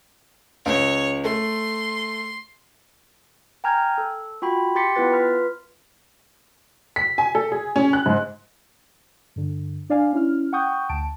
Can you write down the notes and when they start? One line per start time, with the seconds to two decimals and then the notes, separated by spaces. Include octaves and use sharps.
0.66 C#2 C#5
1.25 A3 C6
3.64 G5 G#5 A#5 F6 G6 G#6
3.98 A4
4.42 F4 F#4 G5 B5
4.75 G4 G5 C6 A6 B6 C#7
4.95 B3 E4 F4 B4 A6
5.11 F4 B4 F6 B6
6.96 B6
7.18 G#5
7.35 A4
7.52 G#4
7.76 C#4
7.93 F#6
8.06 G#2
9.36 G2 D3
9.90 D4 D5 F5 G#5
10.13 C#4 E4 F6
10.53 F#5 G5 C#6 D#6 G6
10.89 D2 A5 D7